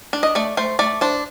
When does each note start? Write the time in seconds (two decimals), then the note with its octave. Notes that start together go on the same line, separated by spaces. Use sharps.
0.13 D4
0.23 D#5
0.35 A3 D5
0.57 A3 C5
0.79 A3 D5
1.01 D4 C5